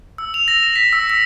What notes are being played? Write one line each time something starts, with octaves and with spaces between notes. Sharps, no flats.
E6
F7
A#6
E7
B6
E6
E6